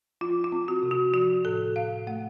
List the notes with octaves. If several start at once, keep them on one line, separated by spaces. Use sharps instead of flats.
F3 F4
F4
C4
F#4
C3
F#4
F3 F#4
A2 A4
A2 F5
A3 F#5